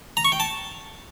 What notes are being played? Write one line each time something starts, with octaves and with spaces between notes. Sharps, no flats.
A#5
C#6
G5
A5